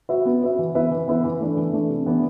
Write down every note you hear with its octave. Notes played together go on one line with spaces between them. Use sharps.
F#4 B4 E5
B3
F#4 B4 E5
E3
B3 E4 B4 E5
E3
B3 E4 B4 E5
E3
A3 D4
E3
A3 D4
C3
E3 B3 D4